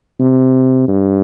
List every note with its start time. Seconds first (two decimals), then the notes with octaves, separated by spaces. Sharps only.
0.20 C3
0.88 G2